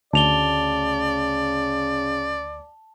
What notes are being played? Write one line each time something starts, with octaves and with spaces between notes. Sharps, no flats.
D2 C#3 D5 A5 F7 G7